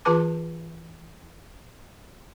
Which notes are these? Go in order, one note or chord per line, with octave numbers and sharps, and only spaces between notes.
E3 F4 G#4 B4 A5 D6